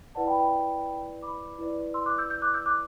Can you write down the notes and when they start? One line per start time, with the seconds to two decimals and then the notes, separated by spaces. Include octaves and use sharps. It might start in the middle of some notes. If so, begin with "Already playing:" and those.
0.15 E4 B4 D5 F#5 A5
0.27 G5 B5
0.39 G5 B5
1.22 B5 D6
1.58 E4 B4 D5
1.94 C6 E6
2.06 D6 F#6
2.18 E6 G6
2.30 E6 G6
2.42 D6 F#6
2.54 E6 G6
2.66 D6 F#6